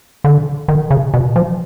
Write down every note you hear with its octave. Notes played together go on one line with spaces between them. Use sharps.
D3
D#3
C#3
B2
F3